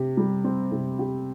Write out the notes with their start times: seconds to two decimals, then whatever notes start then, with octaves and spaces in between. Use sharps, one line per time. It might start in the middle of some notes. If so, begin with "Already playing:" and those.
Already playing: C3 G4
0.17 G3
0.44 C4
0.71 C3
0.99 G4